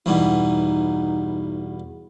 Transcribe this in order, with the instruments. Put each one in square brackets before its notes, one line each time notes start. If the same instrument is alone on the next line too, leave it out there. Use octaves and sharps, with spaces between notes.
[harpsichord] E2 G2 B2 [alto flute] D#4